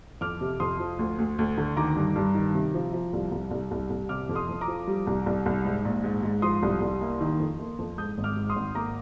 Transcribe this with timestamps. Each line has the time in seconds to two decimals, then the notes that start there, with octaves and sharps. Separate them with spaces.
0.21 F2 D6 F6
0.41 C3
0.60 F2 C6 D#6
0.80 F3
0.99 D2
1.19 D2
1.39 D2
1.58 D3
1.77 D#3 A#5 D6
1.96 G2
2.16 G2
2.35 D#3
2.54 C3
2.74 F3
2.93 F3
3.13 C2
3.32 C2
3.51 C2
3.71 C2
3.90 C2
4.09 C3 D6 F6
4.29 F2
4.35 C6 D#6
4.49 F2
4.61 A#5 D6
4.68 F3
4.87 G3
5.07 C2
5.26 C2
5.46 C2
5.65 G#2
5.85 A#1
6.04 G#2
6.23 G#2
6.42 F3 C6 D#6
6.63 C2
6.81 C2
7.01 A#3
7.21 D#3
7.39 F2
7.60 A#3
7.78 F2
7.98 G#2 D#6 G6
8.18 G#1
8.24 D6 F6
8.37 G#2
8.49 C6 D#6
8.56 G#1
8.75 A#3 A#5 D6